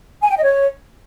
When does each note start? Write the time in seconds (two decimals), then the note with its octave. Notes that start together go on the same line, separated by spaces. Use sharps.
0.22 G#5
0.29 G5
0.37 D#5
0.44 C#5